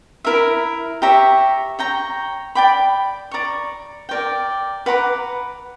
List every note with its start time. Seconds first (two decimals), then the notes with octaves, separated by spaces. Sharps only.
0.24 E4 A#4 E5
1.02 G4 C#5 E5 A#5
1.79 C#5 G5 A#5
2.55 D5 G5 B5 D6
3.31 D5 A#5 C#6
4.09 A#4 D5 G5
4.86 B4 F#5 A#5 D6